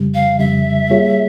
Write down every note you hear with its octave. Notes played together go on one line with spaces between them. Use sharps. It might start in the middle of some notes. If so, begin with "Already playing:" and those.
Already playing: F2 C#3 G3
F5
F2 C#3 G3 E5
G3 A#3 F4 G#4 C#5